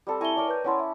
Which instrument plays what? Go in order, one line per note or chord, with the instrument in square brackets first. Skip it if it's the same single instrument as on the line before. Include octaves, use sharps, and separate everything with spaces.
[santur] G3 C4 A4
[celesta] E4 E5 G7 [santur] G#5 A#5 C#6
[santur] A#4 C#5 D5
[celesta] B4 G6
[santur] C#4 E4 A5 [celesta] C#5 F#5 C6
[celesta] E5